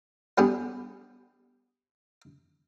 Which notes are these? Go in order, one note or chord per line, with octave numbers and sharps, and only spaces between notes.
G3 B3 D4 G4 G#4